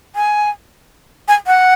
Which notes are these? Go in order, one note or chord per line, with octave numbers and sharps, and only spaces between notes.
G#5
G#5
F#5